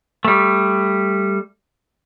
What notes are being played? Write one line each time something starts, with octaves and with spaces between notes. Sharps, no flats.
G3 A3